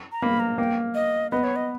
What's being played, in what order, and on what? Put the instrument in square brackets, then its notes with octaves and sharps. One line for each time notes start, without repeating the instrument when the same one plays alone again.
[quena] A#5
[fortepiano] A#3 [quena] B5
[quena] A#5
[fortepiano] A#3 [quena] G5
[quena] D#5
[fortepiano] B3 [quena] D#5
[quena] C#5
D#5